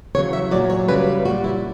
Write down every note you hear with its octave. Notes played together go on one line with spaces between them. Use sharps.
E2 C#3 F#3 C#5
E5
A#2 F#3 D5
C#5
F#2 C#3 G3 B4
A#2 G3 F#4
E4